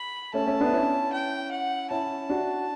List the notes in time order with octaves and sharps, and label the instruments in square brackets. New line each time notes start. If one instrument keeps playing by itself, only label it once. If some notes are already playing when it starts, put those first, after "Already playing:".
Already playing: [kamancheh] B5
[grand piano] A3 C#4 [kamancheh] A5
[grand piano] A3 C#4
B3 D4
C#4 E4
[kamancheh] G5
F#5
[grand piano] C#4 E4 [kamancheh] A5
[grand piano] D4 F#4